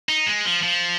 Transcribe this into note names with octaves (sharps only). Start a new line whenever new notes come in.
D#4
G#3
F3
F3